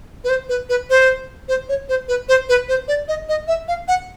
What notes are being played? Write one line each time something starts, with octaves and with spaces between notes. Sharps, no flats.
B4
C5
B4
B4
C5
C5
C#5
C5
B4
C5
B4
C5
D5
D#5
D#5
E5
F5
F#5